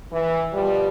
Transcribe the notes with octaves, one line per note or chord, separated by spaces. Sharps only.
E3
B2 F3 G3